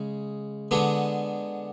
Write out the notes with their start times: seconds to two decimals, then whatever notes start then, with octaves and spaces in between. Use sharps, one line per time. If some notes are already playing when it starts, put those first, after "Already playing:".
Already playing: C#3 G#3
0.71 D3 G#3 B3 D4